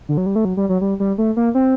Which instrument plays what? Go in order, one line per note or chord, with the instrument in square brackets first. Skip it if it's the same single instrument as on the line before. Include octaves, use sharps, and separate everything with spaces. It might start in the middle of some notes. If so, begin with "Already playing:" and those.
[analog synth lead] D3
F#3
G3
A3
F#3
G3
F#3
G3
G3
A3
A#3
C4